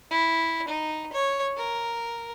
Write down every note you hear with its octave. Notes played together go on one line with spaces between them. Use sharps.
E4
D#4
C#5
A#4